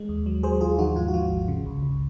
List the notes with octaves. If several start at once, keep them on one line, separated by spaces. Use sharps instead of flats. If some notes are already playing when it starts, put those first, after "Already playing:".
Already playing: G#3
D#2
F#3
F#3 G#4 C5
D#2 F4 G#4
F3 D#4 F#4
G#2 F4
F#4
F3 F4
G#1
C#3
C#2
C#2